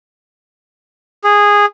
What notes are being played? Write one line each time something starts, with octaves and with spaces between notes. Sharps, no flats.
G#4